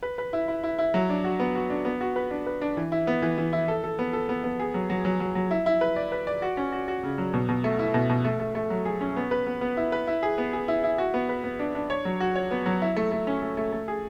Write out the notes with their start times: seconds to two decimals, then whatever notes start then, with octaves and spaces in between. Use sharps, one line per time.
0.03 B4
0.18 B4
0.33 E4
0.48 E4
0.63 E4
0.78 E4
0.94 F#3
1.09 D4
1.24 F#4
1.40 B3
1.55 F#4
1.70 D4
1.85 B3
2.01 F#4
2.16 B4
2.31 D4
2.46 B4
2.61 D4
2.77 E3
2.92 E4
3.07 B3
3.22 E3
3.38 E3
3.53 E4
3.68 A4
3.84 A4
3.99 B3
4.13 A4
4.29 B3
4.44 B3
4.59 G#4
4.74 F#3
4.90 F#3
5.05 F#3
5.20 F#3
5.35 F#3
5.51 E4
5.66 E4
5.81 B4
5.96 D5
6.12 B4
6.27 D5
6.42 F#4
6.57 C#4
6.72 F#4
6.88 F#4
7.03 C#3
7.18 F#3
7.34 B2
7.49 B2
7.64 A3
7.79 E4
7.94 B2
8.10 B2
8.25 A3
8.40 A3
8.55 A3
8.70 F#3
8.85 G#4
9.01 C#4
9.16 B3
9.31 B4
9.47 B3
9.61 B3
9.77 E4
9.92 B4
10.07 E4
10.23 G#4
10.38 B3
10.53 G#4
10.68 E4
10.84 E4
10.98 F#4
11.14 B3
11.29 B4
11.44 B3
11.59 D4
11.75 D4
11.90 C#5
12.05 F#3
12.20 F#4
12.36 C#5
12.51 B3
12.66 F#3
12.82 E4
12.96 A3
13.12 A3
13.27 C#4
13.42 A3
13.57 A3
13.72 A3
13.88 G#4